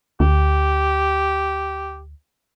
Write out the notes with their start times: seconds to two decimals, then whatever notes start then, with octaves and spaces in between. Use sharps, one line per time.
0.20 D2 G4